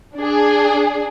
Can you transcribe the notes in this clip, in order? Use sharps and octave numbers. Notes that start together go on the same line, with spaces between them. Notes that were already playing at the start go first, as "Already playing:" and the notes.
D4 G#4